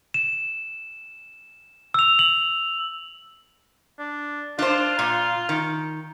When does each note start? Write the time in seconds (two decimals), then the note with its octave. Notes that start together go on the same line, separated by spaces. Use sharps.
0.14 E7
1.94 E6 F7
2.19 F#7
3.99 D4
4.59 D4 F4 C5
4.99 A#2
5.49 D#3